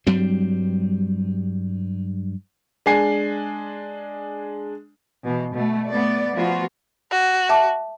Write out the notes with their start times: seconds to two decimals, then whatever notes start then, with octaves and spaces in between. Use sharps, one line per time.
0.07 G2 F#3 G3 C4
2.86 G#3 D4 G#5 C7
5.24 B2 E3
5.54 B2 A3
5.90 A3 B3 D5
6.35 F3 A3 B3 F4 F#4
7.11 F#4
7.49 E5 A5 D6